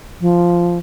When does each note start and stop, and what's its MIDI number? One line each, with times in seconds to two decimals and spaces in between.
0.21 0.78 53